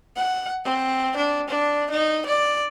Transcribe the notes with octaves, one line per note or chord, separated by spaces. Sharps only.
F#5
C4
D4
D4
D#4
D5